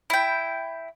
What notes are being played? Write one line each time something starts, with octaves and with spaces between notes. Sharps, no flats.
E4 G5